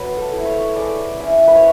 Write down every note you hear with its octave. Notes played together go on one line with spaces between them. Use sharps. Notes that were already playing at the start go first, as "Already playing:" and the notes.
Already playing: F#3 B4
A4
A3 E4
C#5
G#3 D5
C#4 E4 E5
B4
C#5